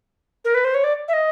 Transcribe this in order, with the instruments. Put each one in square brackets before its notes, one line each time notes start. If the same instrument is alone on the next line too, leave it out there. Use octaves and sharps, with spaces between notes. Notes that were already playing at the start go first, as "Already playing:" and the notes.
[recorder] A#4
B4
C5
C#5
D5
E5
D#5